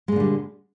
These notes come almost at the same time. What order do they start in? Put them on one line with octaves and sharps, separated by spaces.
G#3 A#2 D3 G3